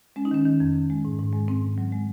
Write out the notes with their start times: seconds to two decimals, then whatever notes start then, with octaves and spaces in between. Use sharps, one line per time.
0.16 G#3 C#4
0.25 D#4
0.31 D#3 C#4
0.46 D#3
0.60 F2
0.75 F2
0.90 G#3
1.05 G#2
1.19 G#2
1.33 G#3
1.48 G#2 C4
1.63 G#2
1.78 F#3
1.92 G#3